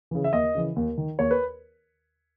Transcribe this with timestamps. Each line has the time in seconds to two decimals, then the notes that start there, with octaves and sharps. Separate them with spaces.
0.11 C#3 E3
0.24 E5
0.33 D#2 D#5
0.55 C#3 E3
0.76 D#2
0.98 D#3
1.19 D#2 C#5
1.31 B4